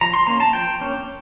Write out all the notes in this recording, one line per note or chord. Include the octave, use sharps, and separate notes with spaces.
F3 A#5
C6
A#3 C#4 A#5
A5
F3 G5
A#3 C#4